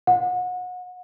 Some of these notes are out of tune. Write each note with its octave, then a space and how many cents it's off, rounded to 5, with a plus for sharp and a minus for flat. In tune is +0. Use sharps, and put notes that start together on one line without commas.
F#5 -30